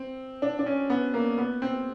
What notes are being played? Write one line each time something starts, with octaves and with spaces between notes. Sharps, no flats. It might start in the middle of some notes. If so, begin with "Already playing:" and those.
Already playing: C4
D4
D4
C#4
B3
A#3
B3
C4